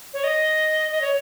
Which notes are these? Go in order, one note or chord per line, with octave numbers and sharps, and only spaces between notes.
C#5
D#5
D#5
C#5